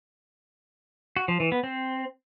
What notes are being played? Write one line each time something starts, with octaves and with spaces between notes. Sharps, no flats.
F#4
F3
E3
B3
C4